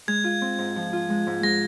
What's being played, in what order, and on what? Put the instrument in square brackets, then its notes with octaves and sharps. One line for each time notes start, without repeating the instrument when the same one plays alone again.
[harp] G#3 [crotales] G#6
[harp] F4
C4
G#2
F3
F4
G#3
G#2
[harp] G#3 [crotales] A#6